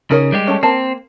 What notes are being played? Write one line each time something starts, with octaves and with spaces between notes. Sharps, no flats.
C#3 D#4 A#4 C#5
G3 G#3 G4
A3 C#4
A#3 C4 A5